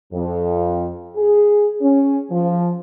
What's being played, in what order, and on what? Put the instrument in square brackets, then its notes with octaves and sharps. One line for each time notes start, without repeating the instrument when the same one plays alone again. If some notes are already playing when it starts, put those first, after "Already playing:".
[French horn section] F2
G#4
C#4
F3